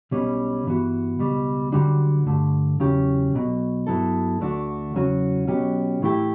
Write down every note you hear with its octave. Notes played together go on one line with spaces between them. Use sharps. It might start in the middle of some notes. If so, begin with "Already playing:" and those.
B1 B2 G3 C#4
G2 E3 B3 F#4
C#2 B2 G3
F#2 D3 G3 D4 F#4
G2 D3 A3
E2 C#3 F#3 C#4 G4
B1 B2 F#3
G2 F#3 B3 E4 A4
D2 D3 A3 D4 F#4
E2 C#3 F#3 C#4 F#4
B2 F#3 C#4 G4
A2 E3 A3 E4 G4